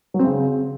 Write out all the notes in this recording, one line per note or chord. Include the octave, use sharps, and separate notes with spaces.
F#3
C4
C#3